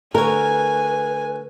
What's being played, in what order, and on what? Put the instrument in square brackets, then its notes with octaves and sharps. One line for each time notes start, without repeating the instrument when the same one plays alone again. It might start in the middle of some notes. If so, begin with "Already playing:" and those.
[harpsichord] D2 C#5 [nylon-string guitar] A#4 [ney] B4 [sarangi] G#5